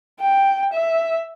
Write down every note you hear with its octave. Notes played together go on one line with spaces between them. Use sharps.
G5
E5